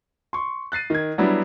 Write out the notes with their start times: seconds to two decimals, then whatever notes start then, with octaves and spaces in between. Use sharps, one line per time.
0.33 C6 C#6
0.72 F#6 A6 C7 D#7
0.90 D#3 G#6
1.18 F#3 G3 B3 D4 E4 F#4